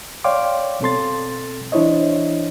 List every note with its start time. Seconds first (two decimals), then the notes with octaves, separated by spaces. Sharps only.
0.24 C#5 D5 F5 G5 C6 D6
0.81 B2 C4 A4 C6 A6
1.72 E3 D4 E4 C5 C#5 D#5